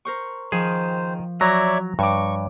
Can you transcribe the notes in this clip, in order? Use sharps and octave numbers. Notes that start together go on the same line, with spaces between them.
A#4 C5 C#6
D#3 F3 G#4 C5
F#3 C#5 D5 E5 A#5
G2 C#5 C#6 D6